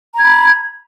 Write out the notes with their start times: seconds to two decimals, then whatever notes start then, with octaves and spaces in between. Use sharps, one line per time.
0.14 A#5
0.18 G#6
0.23 B5